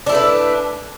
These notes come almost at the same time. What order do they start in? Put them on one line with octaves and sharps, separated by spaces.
D4 E4 A3 B4